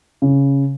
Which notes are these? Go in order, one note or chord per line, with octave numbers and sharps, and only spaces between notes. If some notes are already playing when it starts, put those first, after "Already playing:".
C#3